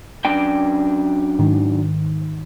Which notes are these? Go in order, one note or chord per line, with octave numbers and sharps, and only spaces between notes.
F#2 D4 G5
G#2 D#3